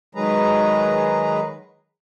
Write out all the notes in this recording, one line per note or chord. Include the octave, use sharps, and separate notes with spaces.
D#3 F#3 G#3 G#4 B4 A#5